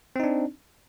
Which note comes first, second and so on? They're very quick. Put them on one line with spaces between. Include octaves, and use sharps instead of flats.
C4 D#4 D4